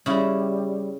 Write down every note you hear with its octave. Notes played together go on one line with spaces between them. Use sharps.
C#3 G3 E4